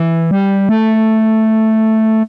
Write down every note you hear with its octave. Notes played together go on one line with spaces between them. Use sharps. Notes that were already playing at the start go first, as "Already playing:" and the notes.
Already playing: E3
G3
A3